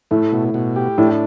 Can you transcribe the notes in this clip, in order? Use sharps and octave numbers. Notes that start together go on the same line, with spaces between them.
A2 A3
B2
B2
G4
A2 D4